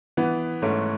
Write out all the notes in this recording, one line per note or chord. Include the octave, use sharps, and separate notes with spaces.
E3 B3
G#2 A3 C#4